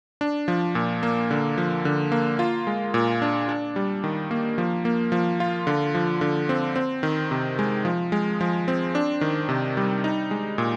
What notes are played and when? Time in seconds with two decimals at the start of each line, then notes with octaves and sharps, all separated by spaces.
0.21 D4
0.48 F3
0.75 A#2
1.03 A#3
1.31 D3
1.58 F3
1.85 D3
2.12 A#3
2.39 F4
2.67 G#3
2.94 A#2
3.22 D4
3.49 D4
3.76 G3
4.04 D#3
4.31 A#3
4.58 F3
4.85 A#3
5.12 F3
5.40 F4
5.67 D3
5.95 F3
6.21 D3
6.49 C4
6.76 C4
7.03 D#3
7.31 C3
7.59 G#3
7.85 F3
8.12 G#3
8.41 F3
8.68 C4
8.95 D4
9.21 D#3
9.49 C3
9.77 G3
10.04 D#4
10.31 G#3
10.58 A#2